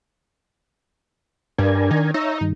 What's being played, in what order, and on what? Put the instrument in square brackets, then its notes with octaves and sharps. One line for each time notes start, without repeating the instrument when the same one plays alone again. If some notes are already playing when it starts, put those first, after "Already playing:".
[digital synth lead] G2 [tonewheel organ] D4 A#4 G#5
[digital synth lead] D#3
[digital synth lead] D#4 [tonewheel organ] C#5 E5 A#5
[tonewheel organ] G2 D#3